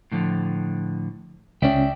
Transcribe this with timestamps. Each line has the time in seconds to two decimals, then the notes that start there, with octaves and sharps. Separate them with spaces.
0.12 A2 D3 F3
1.62 C#2 C#4 D5 E5 G5